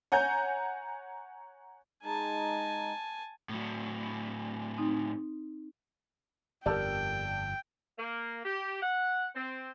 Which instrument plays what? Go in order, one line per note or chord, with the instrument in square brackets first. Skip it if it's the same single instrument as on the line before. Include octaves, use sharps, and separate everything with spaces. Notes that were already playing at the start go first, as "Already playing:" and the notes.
[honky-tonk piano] C#5 F#5 G#5 A#5 G6
[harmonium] G#3 D#4 [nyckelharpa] G#5 A5
[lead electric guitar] A2 F#3
[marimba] C4 D#4
[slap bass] G1 F2 [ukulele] G4 A#4 [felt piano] D5 A5 E6 [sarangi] G5
[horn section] A#3
G4
F#5
C4